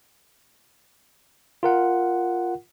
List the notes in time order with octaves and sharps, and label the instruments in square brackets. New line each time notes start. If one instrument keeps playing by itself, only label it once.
[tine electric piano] F4 A#4 F#5